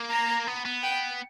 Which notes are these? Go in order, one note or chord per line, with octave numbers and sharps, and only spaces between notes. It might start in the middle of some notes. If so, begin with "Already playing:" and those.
Already playing: A#3
A#5
B3
B3
G5